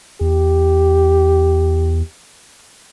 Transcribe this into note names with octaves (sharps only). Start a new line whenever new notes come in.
E2 G4